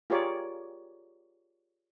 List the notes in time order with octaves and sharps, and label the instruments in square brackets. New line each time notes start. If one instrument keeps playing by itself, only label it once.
[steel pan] F4 G4 G#4 A#4 C#5 D5